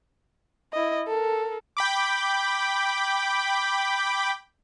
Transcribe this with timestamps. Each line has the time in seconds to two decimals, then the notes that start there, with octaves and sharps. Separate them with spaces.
0.73 E4 D#5
1.08 A4 A#4
1.77 G5 B5 D6